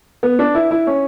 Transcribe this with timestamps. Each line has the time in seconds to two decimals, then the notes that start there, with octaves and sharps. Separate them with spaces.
0.23 B3
0.39 D4
0.55 E4
0.71 E4
0.87 C#4